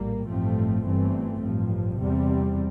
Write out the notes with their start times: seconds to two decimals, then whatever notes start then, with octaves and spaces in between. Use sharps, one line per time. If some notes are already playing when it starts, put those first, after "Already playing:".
Already playing: A#1 A2 G3 A#3
0.27 A1 G2 F3 A3 C4
0.84 G1 G2 E3 A3 C4
1.42 A1 G2 F3
1.99 E2 C3 G3 C4